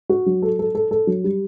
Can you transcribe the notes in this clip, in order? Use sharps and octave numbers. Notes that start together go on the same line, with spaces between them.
F#4
F#3
A4
A4
A4
A4
F#3
G3